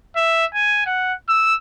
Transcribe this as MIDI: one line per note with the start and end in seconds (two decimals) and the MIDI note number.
0.16 0.45 76
0.55 0.83 80
0.86 1.13 78
1.29 1.55 88